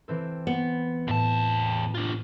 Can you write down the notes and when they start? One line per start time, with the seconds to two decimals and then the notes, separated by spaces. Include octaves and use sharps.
0.08 E3 C4 A4
0.47 B3
1.08 E2 A2 A5
1.95 D4 F4